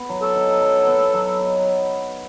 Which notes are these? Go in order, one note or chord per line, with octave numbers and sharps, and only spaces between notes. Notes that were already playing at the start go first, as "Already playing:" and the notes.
Already playing: B3
F#3
A4
D#4
F#3
B3
F#3
D#4